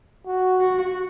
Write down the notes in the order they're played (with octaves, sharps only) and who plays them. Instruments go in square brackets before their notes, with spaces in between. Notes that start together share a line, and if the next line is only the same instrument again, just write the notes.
[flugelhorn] F#4
[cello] F#4